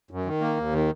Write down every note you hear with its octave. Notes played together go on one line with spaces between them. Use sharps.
F#2
D#3
A#3
D#2
D#3